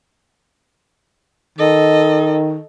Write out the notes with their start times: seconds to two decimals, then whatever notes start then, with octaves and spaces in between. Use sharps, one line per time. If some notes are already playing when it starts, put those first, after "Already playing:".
1.59 D#3 A4 D#5